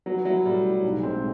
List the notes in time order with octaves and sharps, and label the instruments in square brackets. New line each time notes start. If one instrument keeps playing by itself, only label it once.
[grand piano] F#3 [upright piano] B3
[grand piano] F#3 [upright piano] E4
[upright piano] A2 [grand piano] G3
[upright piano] A2
B1
[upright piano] G#3 [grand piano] C4